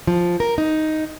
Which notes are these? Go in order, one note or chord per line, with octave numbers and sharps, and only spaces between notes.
F3
A#4
D#4